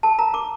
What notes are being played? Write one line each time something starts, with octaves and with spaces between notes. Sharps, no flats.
A#4 A5
A#4 A#5
A#4 D6